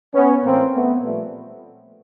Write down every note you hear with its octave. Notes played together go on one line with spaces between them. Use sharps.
B3 C#4
A2 E3 A#3 C4
A3 B3
A#2 F3 G3 A3